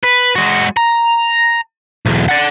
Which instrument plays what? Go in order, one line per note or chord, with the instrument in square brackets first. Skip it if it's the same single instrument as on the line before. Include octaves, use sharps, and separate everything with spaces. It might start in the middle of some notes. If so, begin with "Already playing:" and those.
[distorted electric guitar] B4
G#3 F#4
A#5
B1 E2
D5 F#5